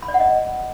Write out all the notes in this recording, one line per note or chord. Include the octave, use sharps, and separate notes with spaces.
B5
D5
F#5
D#5